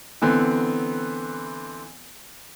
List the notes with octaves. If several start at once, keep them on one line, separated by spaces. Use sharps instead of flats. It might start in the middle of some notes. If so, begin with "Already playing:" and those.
D3 E3 B3 C4